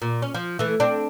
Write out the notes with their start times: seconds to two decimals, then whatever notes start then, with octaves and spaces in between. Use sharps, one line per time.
0.02 A#2
0.22 C#4
0.34 F3
0.59 E3 A3
0.80 C4 D4